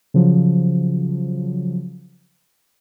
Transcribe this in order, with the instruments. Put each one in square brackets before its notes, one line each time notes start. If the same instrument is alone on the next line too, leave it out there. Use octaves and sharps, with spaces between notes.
[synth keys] C#3 F3 F#3